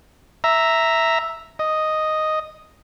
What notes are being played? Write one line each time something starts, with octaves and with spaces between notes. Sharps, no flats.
E5 A#5
D#5